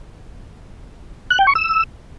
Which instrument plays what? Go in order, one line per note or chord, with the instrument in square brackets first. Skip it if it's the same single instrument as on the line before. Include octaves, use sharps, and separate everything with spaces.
[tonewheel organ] F#6
G5
C#6
E6